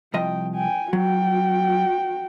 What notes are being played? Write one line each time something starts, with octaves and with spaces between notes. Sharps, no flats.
C2 F3 D#5 G5
G5 G#5
F#3 F#4 G5